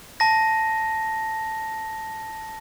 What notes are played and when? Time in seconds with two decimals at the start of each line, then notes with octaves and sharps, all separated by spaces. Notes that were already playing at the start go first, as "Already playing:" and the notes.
0.20 A5 A#6